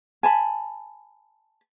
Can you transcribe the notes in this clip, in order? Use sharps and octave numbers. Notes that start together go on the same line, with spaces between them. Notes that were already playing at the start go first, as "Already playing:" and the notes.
G#5 A5 B5